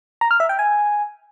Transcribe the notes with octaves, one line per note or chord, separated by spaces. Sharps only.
A#5
F6
E5
G5
G#5